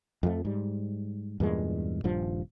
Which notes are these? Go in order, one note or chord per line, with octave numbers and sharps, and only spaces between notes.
F2 F3 A3
G#2 G3
E2 G2 A#2 G#3
D#1 G2 F3